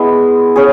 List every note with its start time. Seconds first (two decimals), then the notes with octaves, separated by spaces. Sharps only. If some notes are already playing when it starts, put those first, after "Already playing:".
Already playing: G#3 B3 E4
0.56 C#4 G#4